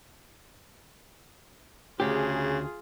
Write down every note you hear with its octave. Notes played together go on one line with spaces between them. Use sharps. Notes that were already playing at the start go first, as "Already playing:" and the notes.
D2 C#3 F4 G4 G#4